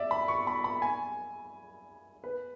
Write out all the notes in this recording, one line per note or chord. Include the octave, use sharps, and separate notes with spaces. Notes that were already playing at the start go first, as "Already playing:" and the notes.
Already playing: D5 E5
B5
C#6
B5
B5
G#5
B4